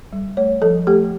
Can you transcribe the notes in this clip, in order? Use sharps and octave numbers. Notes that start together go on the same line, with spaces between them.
G3
A3 C#5
F3 A4
A3 G4